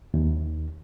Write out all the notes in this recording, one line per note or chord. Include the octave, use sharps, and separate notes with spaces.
D#2